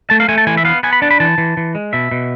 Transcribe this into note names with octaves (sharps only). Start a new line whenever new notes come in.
A3 A5
F5
A3 G#5
A5
E3 G#5
E5
B3 F5
B3 G#5
B5
D4 A5
B5
E3 A5
E3
E3
G#3
B2 E5
B2